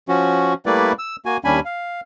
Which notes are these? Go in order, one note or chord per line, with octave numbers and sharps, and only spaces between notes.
F3 C#4 F#4
G3 A3 A#3 E4 B4 D5
E6
A#3 F#4 G#5
D#2 G3 C#4 D4 G#5 B5
F5